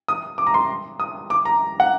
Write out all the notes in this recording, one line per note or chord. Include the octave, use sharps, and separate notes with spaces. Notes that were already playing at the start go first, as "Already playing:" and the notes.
D#6
D6
A#5
C6
D#6
D6
A#5
F#5